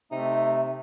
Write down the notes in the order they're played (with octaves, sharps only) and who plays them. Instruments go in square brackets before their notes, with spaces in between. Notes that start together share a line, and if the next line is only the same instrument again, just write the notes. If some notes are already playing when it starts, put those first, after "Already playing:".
[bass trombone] C3 [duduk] A3 [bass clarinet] D#4 [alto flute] E5